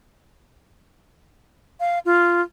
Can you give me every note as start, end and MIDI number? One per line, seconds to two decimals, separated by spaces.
1.80 1.99 77
2.05 2.41 65